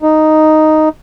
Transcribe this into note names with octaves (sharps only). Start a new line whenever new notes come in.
D#4